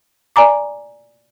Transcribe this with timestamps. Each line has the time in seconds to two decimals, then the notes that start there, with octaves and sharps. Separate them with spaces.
0.36 D5 G#5 A#5 D6